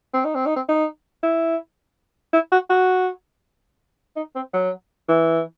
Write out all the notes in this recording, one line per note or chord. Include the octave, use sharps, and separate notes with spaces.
C4
D#4
C4
D#4
C4
D#4
E4
E4
F#4
F#4
D#4
C4
F#3
E3